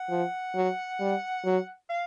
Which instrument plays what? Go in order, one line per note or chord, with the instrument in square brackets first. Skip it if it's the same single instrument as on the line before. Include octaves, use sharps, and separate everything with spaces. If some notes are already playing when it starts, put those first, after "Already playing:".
Already playing: [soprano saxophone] F#5
[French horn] F3
F#3
G3
F#3
[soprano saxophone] F5